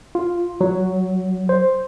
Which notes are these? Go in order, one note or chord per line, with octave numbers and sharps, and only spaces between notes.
F4
F#3
C5